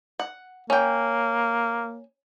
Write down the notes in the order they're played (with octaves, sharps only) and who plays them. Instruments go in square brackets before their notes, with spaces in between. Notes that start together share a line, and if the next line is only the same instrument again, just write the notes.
[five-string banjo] F#5
[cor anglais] A#3 [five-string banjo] C#4 G5